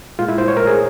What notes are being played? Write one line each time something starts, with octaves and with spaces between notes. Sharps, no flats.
A#2 G#3 F4
E4
C5
C#5
A#4
G#4